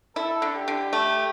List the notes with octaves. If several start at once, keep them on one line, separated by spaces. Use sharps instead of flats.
E4 A4
D3
G4
D3
A3